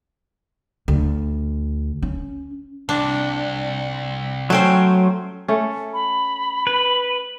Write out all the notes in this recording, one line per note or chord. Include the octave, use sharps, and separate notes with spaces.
D2
C#4
C2 D4
F#3 A3 C#4 C5 G5
A3 C#4
B5
B4